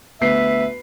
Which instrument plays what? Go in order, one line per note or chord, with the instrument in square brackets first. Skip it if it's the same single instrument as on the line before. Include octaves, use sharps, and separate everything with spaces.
[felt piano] D2 B3 C7 [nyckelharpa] B4 [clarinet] E5